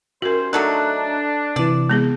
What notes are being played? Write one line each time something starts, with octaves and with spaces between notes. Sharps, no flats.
D#2 C#4 F#4 A#4 C5
F#3 A3 D4 D#4 A4 F#6
C3 E3 D5
G#3 B3 G#4